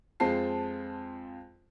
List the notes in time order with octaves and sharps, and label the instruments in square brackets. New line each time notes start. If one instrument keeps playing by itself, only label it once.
[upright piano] F2 G#3 C4 F4 A5 C7